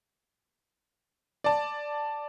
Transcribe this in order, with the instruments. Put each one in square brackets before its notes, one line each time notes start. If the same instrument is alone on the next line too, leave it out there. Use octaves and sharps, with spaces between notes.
[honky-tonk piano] D5 A5